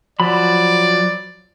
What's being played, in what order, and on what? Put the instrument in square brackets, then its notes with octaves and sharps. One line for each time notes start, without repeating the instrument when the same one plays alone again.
[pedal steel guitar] F3 F#3 B5 [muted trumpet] D5